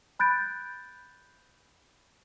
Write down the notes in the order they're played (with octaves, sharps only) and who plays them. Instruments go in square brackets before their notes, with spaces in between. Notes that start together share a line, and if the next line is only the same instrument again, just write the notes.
[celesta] B5 F#6 G6 A6 D7